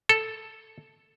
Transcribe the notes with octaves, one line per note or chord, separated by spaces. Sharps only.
A4